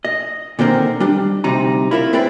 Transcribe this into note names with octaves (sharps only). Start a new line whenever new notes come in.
D#5
A#2 D3 D#3 C4 A#4
G3 D4
D2 C3 G3 D#4 A#5
E4 F4 A#4 D5 E5
C4 E4 G#4 B4 D5